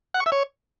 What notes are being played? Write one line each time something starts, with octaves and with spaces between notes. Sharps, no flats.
F#5
C#6
E5
C#5